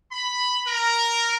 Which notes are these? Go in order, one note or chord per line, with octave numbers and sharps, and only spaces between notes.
B5
A#4